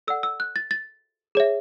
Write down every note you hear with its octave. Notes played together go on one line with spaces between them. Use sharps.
A4 D5 F#5 E6
E6
F#6
A6
A6
G#4 C#5 E5